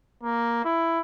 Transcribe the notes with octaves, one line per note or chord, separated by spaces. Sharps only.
A#3
E4